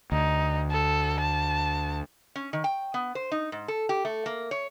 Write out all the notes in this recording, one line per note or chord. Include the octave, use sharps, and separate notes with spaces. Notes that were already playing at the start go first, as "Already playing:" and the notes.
D2 D#4
A4
A5
C#4
D#3
G5
B3
C5
D#4
G#2
A4
G4
A3
A#3
C#5